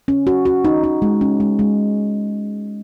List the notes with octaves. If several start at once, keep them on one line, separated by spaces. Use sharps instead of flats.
C#4
F#4
F#4
D#4
D#4
G#3
C#4
G#3
G#3